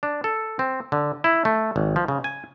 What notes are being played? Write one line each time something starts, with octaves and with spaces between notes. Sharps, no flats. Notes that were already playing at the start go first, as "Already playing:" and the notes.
D4
A4
C4
D3
E4
A3
G#1
F3
C#3
G#5